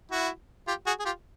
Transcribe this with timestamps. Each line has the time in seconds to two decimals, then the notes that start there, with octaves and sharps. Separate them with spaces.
0.11 E4 F#4
0.68 F4 G4
0.87 F#4 G#4
1.00 G#4
1.05 F4 G4